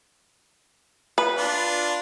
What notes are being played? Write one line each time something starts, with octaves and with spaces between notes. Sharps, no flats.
B4
D4 F4